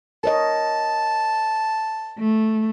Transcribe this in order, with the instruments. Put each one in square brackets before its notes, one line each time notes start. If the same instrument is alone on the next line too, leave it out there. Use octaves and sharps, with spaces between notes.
[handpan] A#4 C#5 D#5 [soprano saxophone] A5
[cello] A3